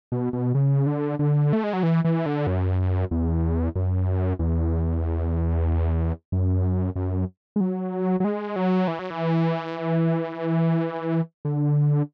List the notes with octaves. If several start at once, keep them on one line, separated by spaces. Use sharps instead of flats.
B2
B2
C#3
D3
D3
A3
G#3
F#3
E3
E3
D3
F#2
E2
F#2
E2
F#2
F#2
G#3
F#3
F#3
G#3
F#3
E3
F#3
E3
D3